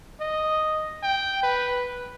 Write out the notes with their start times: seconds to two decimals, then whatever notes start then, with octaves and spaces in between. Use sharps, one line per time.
0.20 D#5
1.03 G5
1.43 B4